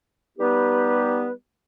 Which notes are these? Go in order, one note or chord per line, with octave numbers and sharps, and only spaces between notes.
G3 B3 D#4 G4 B4